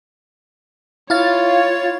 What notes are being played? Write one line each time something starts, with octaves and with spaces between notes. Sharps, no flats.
E4 F4 C#5 F5 A6